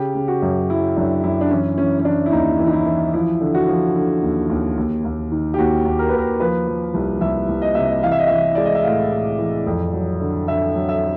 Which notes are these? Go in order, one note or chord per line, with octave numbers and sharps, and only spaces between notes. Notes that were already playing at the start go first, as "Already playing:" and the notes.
Already playing: C#3 G4
C#3
F#4
F#2
F#3 E4
F#2 D4
F#2 E4
D4
E3 C#4
E3 C#4
C#4
E3 D4
E4
D#2 D#4
E3
D#4
E4
E3
F3 E4
D3
F#4
F3
D3
D#2
D#2
D#2
D#2
D#3
G4
D#2 F#4
D#2
A#4
D#2 B4
A#4
F3 B4
F3
C2
C2 E5
C2
D#5
C3 E5
D#5
E3 F5
E5
D#5
E3 E5
G#3 D5
D#5
E5
A2 F5
A2
E3
F2
F#3
D3
D3 E5
F#3
E5